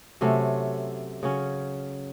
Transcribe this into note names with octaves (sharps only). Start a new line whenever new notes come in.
C3 F#3 A3 C#4
C#3 F#3 C#4